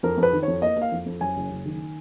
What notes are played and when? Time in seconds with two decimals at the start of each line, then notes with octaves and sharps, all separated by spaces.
0.03 F2 A#4
0.18 F2
0.23 B4
0.33 D#3
0.43 F2 C#5
0.62 A#3 D#5
0.76 A#3
0.81 F5
0.92 F2
1.06 F2
1.21 F#2 G#5
1.36 F#1
1.51 F#1
1.66 D#3